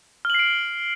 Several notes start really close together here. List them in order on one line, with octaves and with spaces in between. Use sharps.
F6 F#7 C7 D7